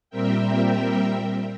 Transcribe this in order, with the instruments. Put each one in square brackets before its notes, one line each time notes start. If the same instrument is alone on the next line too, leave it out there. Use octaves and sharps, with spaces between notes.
[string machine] A#2 G3 C4 A#4 E5 G5